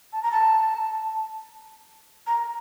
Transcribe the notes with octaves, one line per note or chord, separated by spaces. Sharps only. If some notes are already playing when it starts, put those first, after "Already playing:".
A5
A#5
A5
A#5